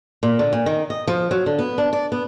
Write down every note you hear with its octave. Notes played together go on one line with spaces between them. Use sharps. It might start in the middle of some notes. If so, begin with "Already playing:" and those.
A#2
D3
A#2
D#3
D#5
F3
F#3
D3
B3
D4
D5
B3